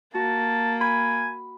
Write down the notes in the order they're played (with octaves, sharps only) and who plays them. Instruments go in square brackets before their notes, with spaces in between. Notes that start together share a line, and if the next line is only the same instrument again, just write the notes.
[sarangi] A#3 [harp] F#4 [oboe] A5
[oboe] G#5 [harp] B5